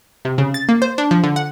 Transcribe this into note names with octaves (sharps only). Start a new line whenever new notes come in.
C3
C#3
A6
A#3
C5
D4
F3
D3
F#5